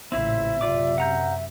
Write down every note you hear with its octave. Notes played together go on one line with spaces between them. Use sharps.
A1 A#2 C#3 C4 E4 C5 E5
F#2 C3 F4 D5 D6
F#5 A#5 G6